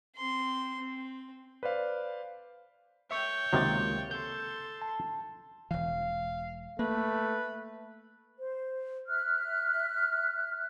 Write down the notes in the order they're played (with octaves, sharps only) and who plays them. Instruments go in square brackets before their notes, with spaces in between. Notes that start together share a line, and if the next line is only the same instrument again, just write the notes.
[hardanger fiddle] C4 C6
C4
[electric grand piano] B4 C5 D5 F5
[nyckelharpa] C#5 G5 [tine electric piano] E5 C#6
[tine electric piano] C#2 A#3 A6 [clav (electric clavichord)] C3 D#3 F#3
[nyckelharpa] A4 C6 [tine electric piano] G6
[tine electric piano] A5
[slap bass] E1 E3 [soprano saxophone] F5
[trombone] A3 [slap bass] A#3 [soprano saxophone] B4
[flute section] C5
E5 F6 F#6